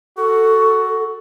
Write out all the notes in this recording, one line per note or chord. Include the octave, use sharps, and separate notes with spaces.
F#4 A4